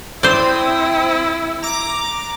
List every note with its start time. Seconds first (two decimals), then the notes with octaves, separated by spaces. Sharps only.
0.23 C4 E4 C5 D5 D#6
1.63 A#5 D6